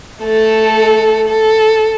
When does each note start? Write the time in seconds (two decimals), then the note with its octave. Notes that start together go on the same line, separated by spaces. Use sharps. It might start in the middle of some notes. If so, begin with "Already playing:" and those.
0.23 A3 A4
1.28 A4